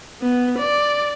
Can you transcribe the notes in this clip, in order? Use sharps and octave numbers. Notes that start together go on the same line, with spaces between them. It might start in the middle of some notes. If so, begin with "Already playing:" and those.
B3
D5